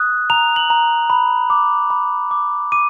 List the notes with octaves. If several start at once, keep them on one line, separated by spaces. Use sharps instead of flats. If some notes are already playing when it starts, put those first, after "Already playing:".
Already playing: D#6 F#6
A#5 F7
F#7
A#5
B5
D6
B5
D6
D6 D#7